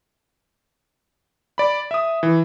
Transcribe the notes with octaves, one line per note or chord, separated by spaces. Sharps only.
D5 B5
E5 D#6
E3